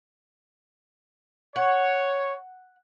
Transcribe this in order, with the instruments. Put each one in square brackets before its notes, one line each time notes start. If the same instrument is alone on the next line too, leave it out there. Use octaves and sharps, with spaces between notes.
[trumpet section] C#5 [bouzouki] F#5